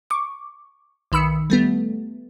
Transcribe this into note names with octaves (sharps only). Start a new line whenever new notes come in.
C#6 D6
B1 D#3 B5 E6 C#7
G3 A3 B3